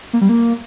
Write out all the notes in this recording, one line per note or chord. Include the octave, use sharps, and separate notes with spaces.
A#3
G3
A#3